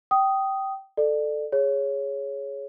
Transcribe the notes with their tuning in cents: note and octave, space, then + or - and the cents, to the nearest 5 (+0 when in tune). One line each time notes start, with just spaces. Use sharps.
G5 -20 D#6 +0
A4 +0 D5 +25
G#4 +0 C#5 +0